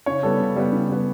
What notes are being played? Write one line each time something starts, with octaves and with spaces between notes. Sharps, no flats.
C#3 C#5
G3 B3 A4
C#3
G3 B3
C#3
G3 B3